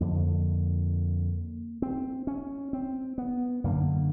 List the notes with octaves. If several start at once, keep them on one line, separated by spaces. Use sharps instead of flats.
F2 D3 A#3
C4
C#4
C4
B3
F#2 D3 A#3